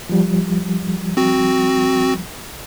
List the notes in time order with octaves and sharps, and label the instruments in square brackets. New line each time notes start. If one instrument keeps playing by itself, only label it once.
[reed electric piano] F3 G3
[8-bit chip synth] C4 F#4